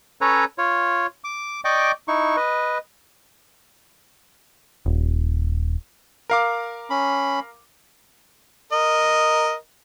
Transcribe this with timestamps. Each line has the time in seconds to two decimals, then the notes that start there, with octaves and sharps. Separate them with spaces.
0.21 C#4 A4 B4 C#5 A#5
0.58 F4 C#5
1.24 D6
1.65 D5 D#5 G5 C#6 D6
2.08 D#4 E4 C#6
2.37 B4 D#5
4.86 D#1
6.30 A#4 F5 D6
6.90 C#4 B5
8.72 A#4 D#5